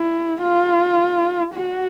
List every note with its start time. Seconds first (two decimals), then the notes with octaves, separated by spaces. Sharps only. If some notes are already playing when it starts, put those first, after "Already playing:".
Already playing: E4
0.42 F4
1.54 F#4